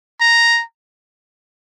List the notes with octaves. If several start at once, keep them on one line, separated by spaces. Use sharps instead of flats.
A#5